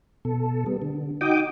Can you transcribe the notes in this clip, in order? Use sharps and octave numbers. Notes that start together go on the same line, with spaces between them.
B2 A4
G3 B3
D3
D#4 F#4 G5 D6 D#6